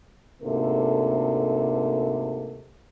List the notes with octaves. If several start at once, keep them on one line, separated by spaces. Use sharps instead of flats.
D2 G#2 C3 A#3 A4